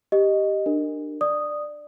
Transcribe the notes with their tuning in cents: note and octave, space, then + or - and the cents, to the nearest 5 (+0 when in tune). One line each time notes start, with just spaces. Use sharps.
G4 +0 D#5 +0
D4 +25 A#4 -20
D5 +15 D#6 -5